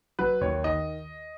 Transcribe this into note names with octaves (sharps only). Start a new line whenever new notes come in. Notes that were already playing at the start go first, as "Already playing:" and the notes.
F#3 B4
D#2 C#5
D#3 D#5